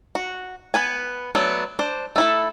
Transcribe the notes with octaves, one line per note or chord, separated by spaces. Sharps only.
F#4
B3 B4 G#5
F#3 A3 B3 D4
D4 C5
A3 E4 A4